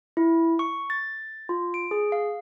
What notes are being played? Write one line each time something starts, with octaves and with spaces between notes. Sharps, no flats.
E4
C#6
A6
F4
D7
G#4
F5